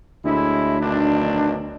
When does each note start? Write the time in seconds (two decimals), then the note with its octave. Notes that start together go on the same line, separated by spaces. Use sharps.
0.25 D2 A2 G#3 E4
0.80 B1 D#3 D4